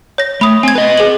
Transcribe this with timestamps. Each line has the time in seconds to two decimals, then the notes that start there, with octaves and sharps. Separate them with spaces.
0.18 C#5 A#6
0.41 A3 B5 D#6
0.63 C4 G#5 G#6
0.75 B4 D#5
0.98 G#4 F#7